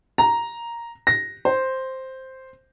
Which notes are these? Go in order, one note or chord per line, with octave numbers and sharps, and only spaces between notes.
A#5
A#6
C5